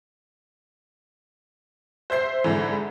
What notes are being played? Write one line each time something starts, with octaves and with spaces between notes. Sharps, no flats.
C5 E5 G6 C7
G#2 D3 E3